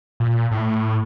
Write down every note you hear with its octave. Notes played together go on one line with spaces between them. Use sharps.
A#2
A2